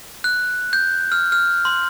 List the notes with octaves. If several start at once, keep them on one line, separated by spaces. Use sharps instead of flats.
F#6
G6
F6
F6
C6